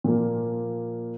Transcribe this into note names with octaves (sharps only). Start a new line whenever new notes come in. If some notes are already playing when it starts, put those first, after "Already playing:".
A#2 F3 A#3